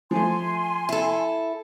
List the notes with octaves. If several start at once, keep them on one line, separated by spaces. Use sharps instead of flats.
F3 A3 G#5 C6
E4 A4